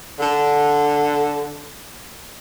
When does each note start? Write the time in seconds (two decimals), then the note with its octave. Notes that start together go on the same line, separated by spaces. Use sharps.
0.18 D3